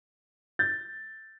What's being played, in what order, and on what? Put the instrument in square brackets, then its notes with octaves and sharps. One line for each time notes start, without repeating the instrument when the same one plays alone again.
[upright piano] G6 A6